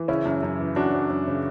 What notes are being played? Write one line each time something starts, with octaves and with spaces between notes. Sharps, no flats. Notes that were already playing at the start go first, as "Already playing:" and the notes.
Already playing: E3
C#3 C#4 E4
F#2
F#2
E3
F#2 D4 F#4
F#2
F#2
C#3